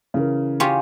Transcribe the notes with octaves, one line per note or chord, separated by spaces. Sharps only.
C#3 E3 A#4
C#4 F4 G4